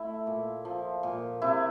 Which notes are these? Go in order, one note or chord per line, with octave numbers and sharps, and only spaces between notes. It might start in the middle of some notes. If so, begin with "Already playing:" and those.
Already playing: A3 E4
A#2
F3
A#2
C3 E4